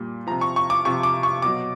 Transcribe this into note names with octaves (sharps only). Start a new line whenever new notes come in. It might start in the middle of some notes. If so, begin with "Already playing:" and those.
Already playing: A#2 G3
C3 F3 A#5
C#6
C#6
D6
C3 F3 C#6
D6
C#6
B2 F#3 D6